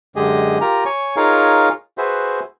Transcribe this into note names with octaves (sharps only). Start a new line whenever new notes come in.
F#2 D3 G#3 G4 G#4 D#5
F4 G4 A#4 A#5
C#5 G#5 C#6
D#4 F4 G#4 A#4 C#5 F5
F#4 G#4 B4 C5 E5